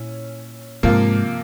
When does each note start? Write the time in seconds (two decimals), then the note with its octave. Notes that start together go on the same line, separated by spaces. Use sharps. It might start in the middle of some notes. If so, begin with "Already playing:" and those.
Already playing: A#2 C#4 E4
0.83 G#2 C3 F3 A#3